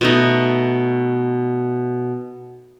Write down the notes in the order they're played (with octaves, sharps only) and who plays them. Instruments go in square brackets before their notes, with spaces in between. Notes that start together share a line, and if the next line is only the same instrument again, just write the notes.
[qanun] B2 A3 D#4